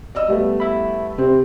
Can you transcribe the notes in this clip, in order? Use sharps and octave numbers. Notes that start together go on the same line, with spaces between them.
D5 D#5 E6
G3 A3 B3
E5 B5
C3 C4